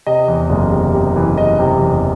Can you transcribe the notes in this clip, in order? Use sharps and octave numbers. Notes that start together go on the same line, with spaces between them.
C3 D#5
E2
F#1
C3
C3
E3
E3 D#5
C3
E2